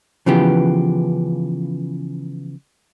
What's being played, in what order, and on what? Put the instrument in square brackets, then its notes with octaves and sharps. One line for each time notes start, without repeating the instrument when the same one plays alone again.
[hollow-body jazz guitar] C#3 E3 F3 B3 G4